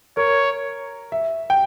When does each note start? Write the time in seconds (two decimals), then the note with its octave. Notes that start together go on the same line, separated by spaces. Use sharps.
0.17 A#4 C#5
1.12 E5
1.50 G5